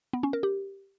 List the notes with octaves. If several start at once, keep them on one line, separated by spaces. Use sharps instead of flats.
B3
C#4
A#4
G4